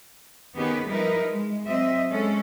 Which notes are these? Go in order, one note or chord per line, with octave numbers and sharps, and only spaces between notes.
D#3 B3 C#4 G4 G#4 B4
F3 G3 D#4 E4 A#4 B4
G#3
F#3 C4 D#5 E5
G#3 C#4 A4